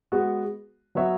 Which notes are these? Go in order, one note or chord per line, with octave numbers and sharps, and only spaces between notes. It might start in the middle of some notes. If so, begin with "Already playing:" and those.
G#3 B3 F#4
F#3 B3 F#4 C#5 E5